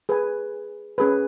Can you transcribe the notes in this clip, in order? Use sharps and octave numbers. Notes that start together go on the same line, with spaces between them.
G#4 B4 G#5
C#4 G#4 B4